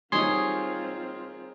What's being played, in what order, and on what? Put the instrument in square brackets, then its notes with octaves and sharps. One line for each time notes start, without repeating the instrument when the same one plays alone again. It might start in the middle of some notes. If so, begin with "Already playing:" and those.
[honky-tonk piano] D#3 F#3 G3 [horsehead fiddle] C4 F4 [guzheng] G#4 C#5 [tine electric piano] C6